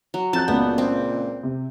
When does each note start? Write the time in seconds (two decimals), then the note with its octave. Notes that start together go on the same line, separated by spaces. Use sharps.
0.14 F#3
0.33 F2 A5 F#6 G6 A6
0.48 C#2 A#2 B3
0.78 C4
1.43 C3